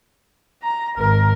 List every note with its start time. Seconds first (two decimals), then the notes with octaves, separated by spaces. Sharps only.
0.63 A#5
0.98 G#1 A#4